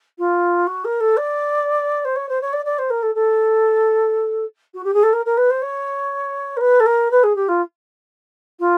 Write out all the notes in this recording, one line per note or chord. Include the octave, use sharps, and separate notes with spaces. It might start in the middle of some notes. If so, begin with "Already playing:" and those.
F4
F#4
A#4
A4
D5
C5
C#5
C5
C#5
D5
D5
C5
A#4
A4
A4
F#4
G4
G#4
A4
A#4
A#4
B4
C5
C#5
A#4
B4
A4
A#4
B4
G#4
G4
F4
F4